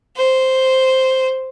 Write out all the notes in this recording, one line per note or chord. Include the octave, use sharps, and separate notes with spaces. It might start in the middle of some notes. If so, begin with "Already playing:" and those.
C5